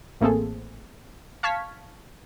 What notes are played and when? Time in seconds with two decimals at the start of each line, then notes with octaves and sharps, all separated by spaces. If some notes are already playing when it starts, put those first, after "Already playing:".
0.21 A1 A3 A#3 C4 G#4 A4
1.43 F5 A5 C#6 F6 G#6 B6